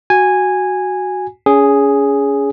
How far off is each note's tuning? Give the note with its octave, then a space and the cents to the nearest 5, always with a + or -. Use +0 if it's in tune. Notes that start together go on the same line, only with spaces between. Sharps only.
F#4 +0 G#5 -10
C#4 +30 G#4 +0